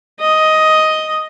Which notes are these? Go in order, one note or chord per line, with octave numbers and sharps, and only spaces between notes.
D#5